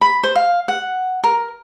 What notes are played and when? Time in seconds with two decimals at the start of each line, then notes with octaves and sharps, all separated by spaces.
0.01 B5
0.23 C5
0.35 F5
0.68 F#5
1.24 A#4